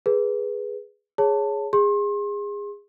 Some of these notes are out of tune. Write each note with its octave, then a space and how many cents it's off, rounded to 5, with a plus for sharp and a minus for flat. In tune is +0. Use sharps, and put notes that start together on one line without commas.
G#4 +0 B4 -5
G#4 +0 C#5 +0 A5 +15
G#4 -25 C6 +35